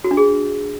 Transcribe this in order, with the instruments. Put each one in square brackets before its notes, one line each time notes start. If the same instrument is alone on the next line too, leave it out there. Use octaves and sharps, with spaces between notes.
[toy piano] F#4
D4
G#4